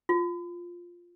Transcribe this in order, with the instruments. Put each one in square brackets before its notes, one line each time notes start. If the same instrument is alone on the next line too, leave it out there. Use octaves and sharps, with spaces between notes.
[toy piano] F4